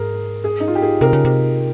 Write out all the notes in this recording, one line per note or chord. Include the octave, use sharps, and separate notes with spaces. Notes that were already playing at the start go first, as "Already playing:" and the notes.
Already playing: G#2 G#4 A#4
G#4
D#4
F4
G4
G#4
C3 A#4
C#3
C3